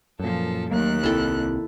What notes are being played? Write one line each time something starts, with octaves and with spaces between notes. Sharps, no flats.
F#2 A#2 F3 A4
D#2 F#3 A3 A#3 F#6
C2 C4 E4 A4